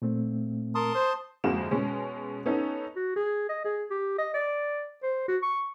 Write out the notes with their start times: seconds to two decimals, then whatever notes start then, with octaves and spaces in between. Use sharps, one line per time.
0.02 A#2 A3 C4
0.75 A#4 A5 C6 D#6
0.95 C5
1.44 G1 F2 G#3 A#3 F#4 E7
1.71 B2 G#3 C#4
2.46 B3 C#4 D#4 A4
2.96 F#4
3.16 G#4
3.49 D#5
3.65 G#4
3.90 G4
4.18 D#5
4.34 D5
5.03 C5
5.28 F#4
5.43 C#6